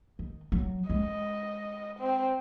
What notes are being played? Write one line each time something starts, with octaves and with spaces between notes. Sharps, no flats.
D#3
F#3
G#3 C#4 D#5
C4